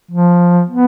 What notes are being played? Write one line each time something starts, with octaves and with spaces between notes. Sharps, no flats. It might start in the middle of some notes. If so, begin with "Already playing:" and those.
F3
B3